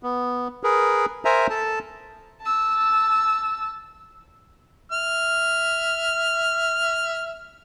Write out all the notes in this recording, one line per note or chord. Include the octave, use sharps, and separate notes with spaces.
B3
G#4 A#4 B4
A#4 C5 E5 G#5 A#5
A4 A5
A5 E6
E5 F6